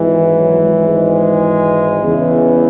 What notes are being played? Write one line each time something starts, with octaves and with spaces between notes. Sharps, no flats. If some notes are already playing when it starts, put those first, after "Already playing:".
Already playing: G#1 G#2 E3
F#3
G#3
G#3
E2 C#3 E3